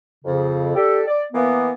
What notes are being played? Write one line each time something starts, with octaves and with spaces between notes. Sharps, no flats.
F2 C#3
D4 G4 A4
D5
E3 A#3 B3